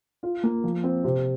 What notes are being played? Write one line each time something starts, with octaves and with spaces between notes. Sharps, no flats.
F4
A#3
F3
C4
C3